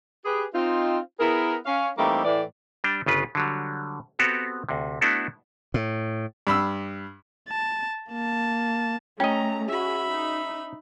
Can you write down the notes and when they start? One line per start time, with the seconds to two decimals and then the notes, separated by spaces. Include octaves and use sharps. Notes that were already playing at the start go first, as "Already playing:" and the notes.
0.25 G4 G#4 B4
0.54 C4 D#4 F4
1.19 B3 E4 G#4 A#4
1.66 C#4 F5
1.98 E3 G3 A3 A#3 C4 D#4
2.25 A2 E3 D5
2.84 G3 D4 G5
3.06 G1 C#3 F4 B4
3.35 D3 F#3 G3
4.19 B3 C4 F#4 G4 A4
4.69 D2 C3
5.01 A3 B3 D4 E4 F#4 A4
5.74 A2
6.47 G2 B5 E6
7.49 A5
8.10 A#3 A5
9.20 A3 C#4 F4 D#5 G5 A#5
9.68 F#4 G#4 E5 B5
10.09 D#4